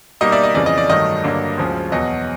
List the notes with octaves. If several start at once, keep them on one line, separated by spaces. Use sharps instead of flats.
B2 G3 A#3 D#4 D#5
D5 E5
D#5
F2 C#3 E3 D5
D#5
D5
G2 D#3 F#3 A3 D#5
G2 D3 F#3 A#3 D4
D2 C#3 F3 G#3
E2 B2 F#3 D#5